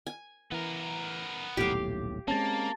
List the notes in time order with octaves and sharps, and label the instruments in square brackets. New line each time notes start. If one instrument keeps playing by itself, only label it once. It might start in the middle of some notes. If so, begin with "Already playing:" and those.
[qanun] G#5
[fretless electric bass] E3 [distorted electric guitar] B3 A#4
[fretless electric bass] D#1 B1 A2 [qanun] G4 F5
[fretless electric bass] G#3 C4 C#4 [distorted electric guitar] A#3 [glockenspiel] A5 A6